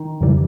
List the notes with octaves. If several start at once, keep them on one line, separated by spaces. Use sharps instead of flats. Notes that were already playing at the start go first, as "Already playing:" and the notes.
Already playing: D#3
F2 C#3 E3 G3